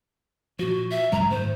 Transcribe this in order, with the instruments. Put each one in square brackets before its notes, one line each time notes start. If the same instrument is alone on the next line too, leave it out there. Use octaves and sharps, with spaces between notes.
[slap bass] A#2 F3 [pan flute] F#4
[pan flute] E5
[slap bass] F#2 F#3 G#3 [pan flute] A#5
[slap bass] G#2 D#3 A3 [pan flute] C5